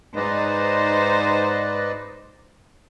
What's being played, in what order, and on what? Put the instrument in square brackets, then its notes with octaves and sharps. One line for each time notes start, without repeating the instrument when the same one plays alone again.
[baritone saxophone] G#2 [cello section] D#4 C5 [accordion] B4 D5 D#5